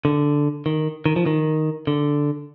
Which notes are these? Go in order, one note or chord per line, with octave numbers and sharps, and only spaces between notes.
D3
D#3
D#3
F3
D#3
D3